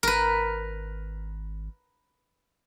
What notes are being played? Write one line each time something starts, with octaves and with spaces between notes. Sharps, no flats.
G#1 A#4 B4